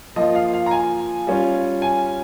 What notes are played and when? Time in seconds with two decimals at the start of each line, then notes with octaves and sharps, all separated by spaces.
0.16 F3 A#3 F4 D#5
0.35 F5
0.53 F5
0.66 A#5
0.71 G#5
1.27 G3 C#4 F4
1.82 G#5